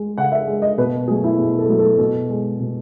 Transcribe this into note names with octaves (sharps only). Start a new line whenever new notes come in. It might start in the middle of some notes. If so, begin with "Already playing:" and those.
Already playing: G#3
C#3 F#5
E5
G#3
D#5
B2 B4
F#3 A3 G#4
E4
B2
A4
F#3 A3
A4
B2
G#3
B2